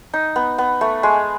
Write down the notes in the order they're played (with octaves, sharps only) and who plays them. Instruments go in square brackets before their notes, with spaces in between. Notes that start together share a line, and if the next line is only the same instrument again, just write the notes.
[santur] D#4
B3
B3
A3
G#3